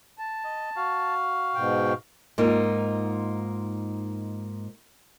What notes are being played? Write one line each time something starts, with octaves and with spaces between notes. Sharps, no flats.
A5
D#5
F#4 F5
G#2 B2 G5
G#2 A#3 D#4 F4